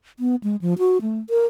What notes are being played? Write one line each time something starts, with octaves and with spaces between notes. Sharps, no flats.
B3
G#3
F3
F#4
A3
A#4